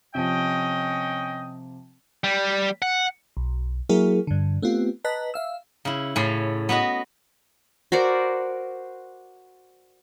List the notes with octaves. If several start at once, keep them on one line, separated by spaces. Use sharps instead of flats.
C3 F3 C#4 D#5 G5
G3
F#5
B1
F#3 A#3 E4 F#4 G#4 A#4
G2 D3
A3 B3 C4 F4 G4
B4 D#5 A5 A#5 F#6 B6
E5 F5 E6
C#3 E4
A2 C#3 C#4 C6
B3 F#4 B4 D#5
F#4 A#4 C5 D5